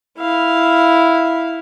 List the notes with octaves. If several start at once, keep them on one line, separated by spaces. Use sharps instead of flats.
E4 F5